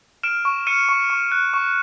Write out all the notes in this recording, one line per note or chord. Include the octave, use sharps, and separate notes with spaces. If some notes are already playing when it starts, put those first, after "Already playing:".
F6 D7 E7
C#6
F6 C#7 D#7
C#6
C#6
F#6
C#6